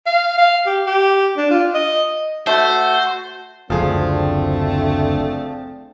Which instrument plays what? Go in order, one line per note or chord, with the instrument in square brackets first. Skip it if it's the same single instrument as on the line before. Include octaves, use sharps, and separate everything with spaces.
[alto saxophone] F5
F5
G4
G4
D4
F4
D#5
[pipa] A3 [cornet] F#4 [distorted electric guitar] C5
[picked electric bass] F#1 D2 [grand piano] F3 G#4 [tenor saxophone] A3 [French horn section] C4 D4